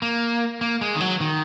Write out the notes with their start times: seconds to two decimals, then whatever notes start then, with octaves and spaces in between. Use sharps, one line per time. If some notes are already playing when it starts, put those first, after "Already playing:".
0.02 A#3
0.61 A#3
0.81 G#3
0.96 D#3
1.01 F#3
1.21 D#3